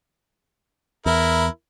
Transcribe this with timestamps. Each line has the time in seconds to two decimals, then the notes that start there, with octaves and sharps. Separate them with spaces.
1.06 E2 E4 A#4